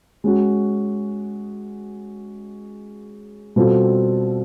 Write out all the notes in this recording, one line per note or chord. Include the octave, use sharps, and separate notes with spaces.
G#3 C#4 F#4
B2 G3 C4 F4 A4